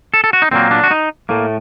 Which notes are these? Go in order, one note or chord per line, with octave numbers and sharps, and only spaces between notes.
A4
A4
F#4
D#4
A#2 F#3 A#3 C4
D4
F#4
D#4
A2 A3 A#3